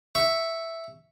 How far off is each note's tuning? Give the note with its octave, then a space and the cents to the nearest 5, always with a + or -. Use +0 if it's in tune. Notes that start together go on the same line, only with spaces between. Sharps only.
E5 +0 C#6 +0